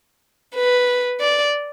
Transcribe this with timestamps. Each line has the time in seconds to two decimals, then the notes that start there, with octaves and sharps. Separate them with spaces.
0.55 B4
1.20 D5